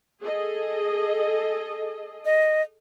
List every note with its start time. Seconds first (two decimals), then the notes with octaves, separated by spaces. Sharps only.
0.21 G#4 A4 D#5
2.25 D#5